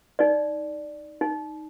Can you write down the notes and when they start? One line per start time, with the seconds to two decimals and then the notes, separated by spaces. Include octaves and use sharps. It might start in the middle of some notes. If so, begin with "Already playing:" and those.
0.19 D#4 D5
1.21 D#4